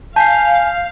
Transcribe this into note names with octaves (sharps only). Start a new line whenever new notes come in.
F5 G#5 A5 G6 B6 C7